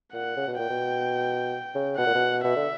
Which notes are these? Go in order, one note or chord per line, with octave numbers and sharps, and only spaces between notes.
A#2 F#5
C#3
B2
A#2 G5
B2
C#3
B2 F#5
A#2
B2
B2 E5
D3